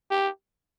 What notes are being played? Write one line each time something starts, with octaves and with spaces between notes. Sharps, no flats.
G4